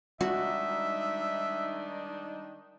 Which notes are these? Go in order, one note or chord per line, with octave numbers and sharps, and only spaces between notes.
D#3 G3 G#3 D4 D#4 F#4 E5